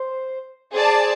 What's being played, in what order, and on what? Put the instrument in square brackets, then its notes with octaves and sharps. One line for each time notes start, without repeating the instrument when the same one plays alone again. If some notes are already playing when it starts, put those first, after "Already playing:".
Already playing: [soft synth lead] C5
[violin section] G#4 D5 A5 [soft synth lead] C5